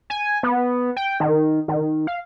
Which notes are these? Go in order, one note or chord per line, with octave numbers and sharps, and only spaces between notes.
G#5
B3
G5
D#3
D#3
F5